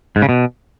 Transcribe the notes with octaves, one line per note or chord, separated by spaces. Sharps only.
G#2
C#3
B2